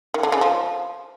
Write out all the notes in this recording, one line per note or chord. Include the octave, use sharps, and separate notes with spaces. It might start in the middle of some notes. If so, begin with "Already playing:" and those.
D#3
D3
C#3
F3